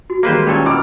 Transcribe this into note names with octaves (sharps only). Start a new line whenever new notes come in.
F#4
D#3 G3 G#3 A#3 B4 C5
A#2 C#4 A4 B4 C#5
B2 E4 C5 D6 E6 F6